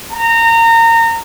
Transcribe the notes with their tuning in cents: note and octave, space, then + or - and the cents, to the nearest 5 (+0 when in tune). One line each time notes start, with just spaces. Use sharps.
A#5 -25